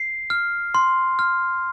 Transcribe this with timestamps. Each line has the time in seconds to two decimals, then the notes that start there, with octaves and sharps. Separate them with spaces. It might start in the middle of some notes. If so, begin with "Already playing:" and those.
Already playing: C7
0.30 F6
0.74 C6
1.19 F6